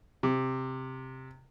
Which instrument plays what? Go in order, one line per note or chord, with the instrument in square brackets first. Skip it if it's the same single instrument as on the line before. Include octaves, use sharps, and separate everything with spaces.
[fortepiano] C3